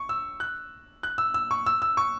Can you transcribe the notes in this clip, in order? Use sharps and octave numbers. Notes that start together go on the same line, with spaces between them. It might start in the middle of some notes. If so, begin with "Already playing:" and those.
Already playing: C#6
E6
F#6
F#6
E6
E6
C#6
E6
E6
C#6